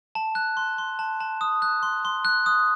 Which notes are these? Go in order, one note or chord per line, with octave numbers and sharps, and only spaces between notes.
A5
F#6
C6
C6
A5
A5
D#6
F#6
C6
C6
F#6
D#6